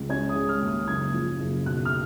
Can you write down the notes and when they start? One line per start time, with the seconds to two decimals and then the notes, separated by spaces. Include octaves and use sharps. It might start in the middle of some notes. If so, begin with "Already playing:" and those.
Already playing: C#2
0.09 C#4 G#6
0.29 D#6
0.35 G#3
0.49 F6
0.61 D#2
0.68 D#6
0.87 F#1 G#6
1.14 F3
1.40 F#1
1.66 B1 F#6
1.85 F6